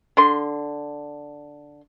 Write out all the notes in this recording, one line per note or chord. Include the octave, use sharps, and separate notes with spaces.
D3 C6